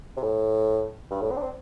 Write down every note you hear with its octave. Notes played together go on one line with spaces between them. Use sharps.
C3
A2
G2
A2
C4
D4
C4